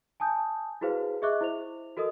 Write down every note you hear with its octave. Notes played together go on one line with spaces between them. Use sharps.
G#5 A5 D#6 G6
E4 F#4 G#4 B4 C5 F5
G#4 D#5 E5 C#6 D6 F#6
E4 C5 F7
F#4 A4 A#4 D#5 D#6